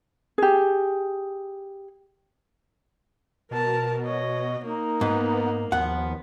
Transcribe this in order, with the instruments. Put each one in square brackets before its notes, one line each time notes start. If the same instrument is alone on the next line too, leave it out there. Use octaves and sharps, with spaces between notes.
[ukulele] G4 G#4
[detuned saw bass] B2 [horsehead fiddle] A#4 A5
[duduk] C#5 [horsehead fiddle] D#5
[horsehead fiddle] A#3 [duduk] D#4
[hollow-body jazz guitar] G#2 [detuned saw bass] B3
[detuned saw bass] D#2 [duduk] F3 [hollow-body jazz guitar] B3 F#5